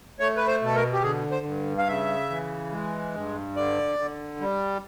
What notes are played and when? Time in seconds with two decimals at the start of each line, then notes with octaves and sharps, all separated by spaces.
0.19 A3 C#5
0.37 B4
0.48 C5
0.62 B2 A4
0.75 A#4
0.93 G4
1.03 D3 G#4
1.31 C5
1.45 G2
1.78 F5
1.88 C#3 E5
2.30 E3
2.72 G#3
3.14 G2
3.56 D3 D5
3.99 D3
4.40 G3